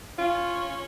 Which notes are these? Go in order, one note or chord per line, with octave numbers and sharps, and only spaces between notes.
C#4 F4